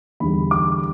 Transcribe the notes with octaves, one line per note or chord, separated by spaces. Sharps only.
E2 D3 G3 B5
D6